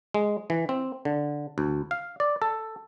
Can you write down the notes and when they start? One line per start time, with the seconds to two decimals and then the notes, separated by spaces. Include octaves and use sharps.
0.14 G#3
0.50 E3
0.69 C4
1.05 D3
1.58 D2
1.91 F5
2.20 D5
2.42 A4